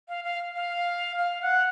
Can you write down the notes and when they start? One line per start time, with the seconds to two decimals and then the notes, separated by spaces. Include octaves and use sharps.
0.08 F5
0.24 F5
0.56 F5
1.18 F5
1.42 F#5